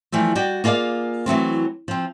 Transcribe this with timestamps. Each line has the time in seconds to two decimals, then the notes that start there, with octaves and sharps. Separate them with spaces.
0.12 E3 F3 G3 A3
0.35 G3 F#4 D5 G5
0.64 A#3 F4 G#4 D5 F5
1.26 E3 F#3 A3 C4
1.88 F3 C4